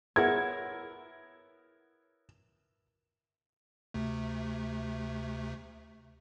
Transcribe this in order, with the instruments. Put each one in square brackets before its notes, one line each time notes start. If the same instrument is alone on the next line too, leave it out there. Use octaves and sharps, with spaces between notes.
[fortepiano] B3 E4 A#4 [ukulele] G#4 C#5 F#5 [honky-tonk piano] G#6
[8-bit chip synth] D2 C3 A3